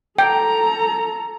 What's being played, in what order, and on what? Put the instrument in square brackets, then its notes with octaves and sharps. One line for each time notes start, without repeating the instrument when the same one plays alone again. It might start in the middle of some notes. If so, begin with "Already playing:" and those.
[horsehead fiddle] A4 A#5 [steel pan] G5